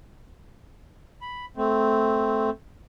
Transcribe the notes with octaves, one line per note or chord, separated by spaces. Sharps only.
B5
A3 C4